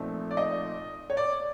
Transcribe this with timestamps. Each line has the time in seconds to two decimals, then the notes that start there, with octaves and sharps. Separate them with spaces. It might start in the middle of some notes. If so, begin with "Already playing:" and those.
Already playing: A#2 F3 A3 C4 D#4
0.31 D5
0.37 D#5
1.10 C#5
1.17 D5